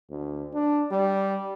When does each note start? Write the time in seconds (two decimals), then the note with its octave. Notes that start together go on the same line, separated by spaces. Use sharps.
0.10 D2
0.54 D4
0.91 G3